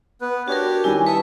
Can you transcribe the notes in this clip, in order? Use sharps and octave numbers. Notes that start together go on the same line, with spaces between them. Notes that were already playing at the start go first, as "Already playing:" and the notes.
B3 B4
D4 F#4 G4 A#4 C#5
D#3 G3 E4 G#5
B4 E5 A5 C#6 D#6